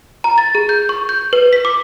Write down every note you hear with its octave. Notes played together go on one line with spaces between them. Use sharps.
A#5
A6
G#4
G6
C#6
G6
B4
B6
D6